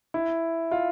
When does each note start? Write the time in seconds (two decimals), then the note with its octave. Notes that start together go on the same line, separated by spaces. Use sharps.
0.14 E4
0.71 F4